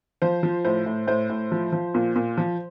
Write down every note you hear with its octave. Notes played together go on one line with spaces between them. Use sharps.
F3 C5
F3
A2 C5
A2
A2 C5
A2
F3
F3
A#2
A#2
F3